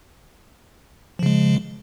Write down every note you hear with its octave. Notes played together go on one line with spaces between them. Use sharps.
C#3 F3 G#3